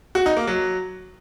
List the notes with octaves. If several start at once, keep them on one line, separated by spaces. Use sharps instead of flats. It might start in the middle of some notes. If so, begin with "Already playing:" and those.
F#4
D#4
A#3
F#3